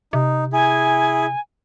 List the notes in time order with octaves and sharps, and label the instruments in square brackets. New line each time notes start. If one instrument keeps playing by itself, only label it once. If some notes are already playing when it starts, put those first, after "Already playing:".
[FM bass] C3 [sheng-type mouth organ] D#4
[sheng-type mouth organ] E4 G#4 [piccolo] G#5